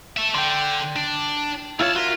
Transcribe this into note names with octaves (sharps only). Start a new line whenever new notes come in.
A4 E5
D3 G5 C6
D4
C#2 E4 F4 C#5 A5
F4 F#4 A#4 E5